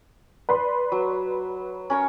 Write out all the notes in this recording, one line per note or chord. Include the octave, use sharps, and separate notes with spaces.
B4 D5 C6
F#3
C#4 A#4 C#5